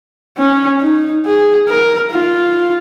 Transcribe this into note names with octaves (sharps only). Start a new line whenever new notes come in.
C#4
D#4
G#4
A#4
F4